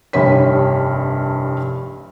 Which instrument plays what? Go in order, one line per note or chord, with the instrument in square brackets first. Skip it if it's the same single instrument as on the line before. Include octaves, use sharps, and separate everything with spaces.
[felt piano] F1 C2 G2 C#5 B6